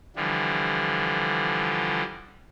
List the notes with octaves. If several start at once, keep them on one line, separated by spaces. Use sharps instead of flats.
D3 E3 F3 G3